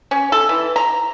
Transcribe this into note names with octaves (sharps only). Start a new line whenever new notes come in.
C#4
A4
E3
A#5